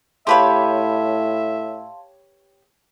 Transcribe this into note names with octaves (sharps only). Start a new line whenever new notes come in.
A2 G4 B4 C#5 E5 F5 A5 C6